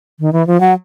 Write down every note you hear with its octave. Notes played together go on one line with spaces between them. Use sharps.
D#3
E3
F3
F#3